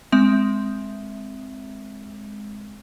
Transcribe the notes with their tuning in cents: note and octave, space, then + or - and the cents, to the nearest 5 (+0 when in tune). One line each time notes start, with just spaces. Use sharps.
G#3 +0 C4 +0 E5 +0